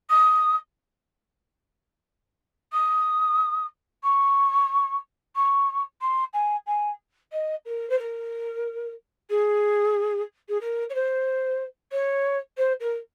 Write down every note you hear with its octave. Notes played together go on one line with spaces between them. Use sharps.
D#6
D#6
C#6
C#6
C6
G#5
G#5
D#5
A#4
C5
A#4
G#4
G#4
A#4
C#5
C5
C#5
C5
A#4